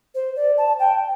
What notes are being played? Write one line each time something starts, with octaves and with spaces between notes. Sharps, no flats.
C5
D5
A5
G5